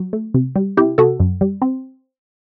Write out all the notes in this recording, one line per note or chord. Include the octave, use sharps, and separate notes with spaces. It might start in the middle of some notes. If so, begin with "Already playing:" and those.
Already playing: F#3
A3
C3
G3
C3 E4 G4
C3 F#4 A4
F#2
G3
C4